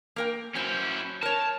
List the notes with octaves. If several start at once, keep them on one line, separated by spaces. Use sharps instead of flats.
A#3 A#4 G5
F#3 C#4 E4 C5
A#4 C#5 A5